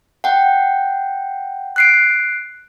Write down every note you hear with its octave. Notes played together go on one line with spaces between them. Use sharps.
F#5 G5
F#6 C7 D7